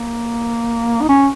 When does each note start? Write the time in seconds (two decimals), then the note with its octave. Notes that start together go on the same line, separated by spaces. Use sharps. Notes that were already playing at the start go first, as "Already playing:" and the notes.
Already playing: A#3
1.02 D#4
1.09 C#4